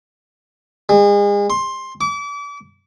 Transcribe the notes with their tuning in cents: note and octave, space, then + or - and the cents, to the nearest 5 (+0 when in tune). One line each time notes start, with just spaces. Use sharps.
G#3 -35
C6 +15
D6 -35